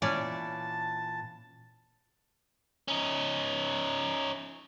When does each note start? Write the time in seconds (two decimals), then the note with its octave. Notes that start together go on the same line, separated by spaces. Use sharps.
0.02 A#2 E3 C#4 E4 D5 A5
2.88 C#4 D#4